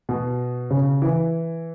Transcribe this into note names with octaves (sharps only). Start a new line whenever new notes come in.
B2
C#3
E3